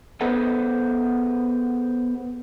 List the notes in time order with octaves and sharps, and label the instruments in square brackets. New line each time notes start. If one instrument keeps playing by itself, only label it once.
[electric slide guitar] B3 G#4 A4 B4 C5 F#5